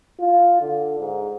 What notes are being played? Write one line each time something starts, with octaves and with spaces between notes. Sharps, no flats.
F4
D3
G#2